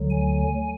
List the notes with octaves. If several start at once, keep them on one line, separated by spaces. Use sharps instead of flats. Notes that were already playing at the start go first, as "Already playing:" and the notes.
Already playing: D2 D3 F#3
G#5